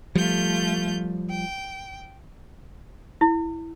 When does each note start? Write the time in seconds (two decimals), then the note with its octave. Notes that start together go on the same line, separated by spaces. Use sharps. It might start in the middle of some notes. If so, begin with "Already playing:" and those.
0.15 F3 G3 A3 F4 G6
1.29 G5
3.21 E4